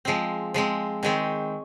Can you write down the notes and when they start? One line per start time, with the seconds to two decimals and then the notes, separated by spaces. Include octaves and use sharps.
0.05 F3 G#3 C4
0.54 F3 G#3 C4
1.03 D#3 G#3 C4 C#5